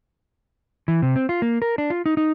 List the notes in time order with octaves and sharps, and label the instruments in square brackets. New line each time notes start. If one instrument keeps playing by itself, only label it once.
[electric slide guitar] E3
C3
C4
F4
A#3
A#4
D4
F4
D#4
D#4